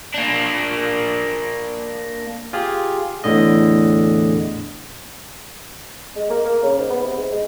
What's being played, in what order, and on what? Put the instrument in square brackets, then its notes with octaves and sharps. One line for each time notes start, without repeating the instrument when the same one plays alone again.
[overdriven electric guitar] A#3 D4
[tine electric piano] F4 G4 G#4
E2 A2 D3 D#5
[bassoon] G#3
A#3
A#3
C#3
G#2
B3
C3
G#2
G#3